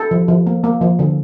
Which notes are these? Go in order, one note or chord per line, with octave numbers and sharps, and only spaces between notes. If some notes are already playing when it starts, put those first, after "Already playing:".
Already playing: A4
F3
F3
A#3
A#3
F3
D3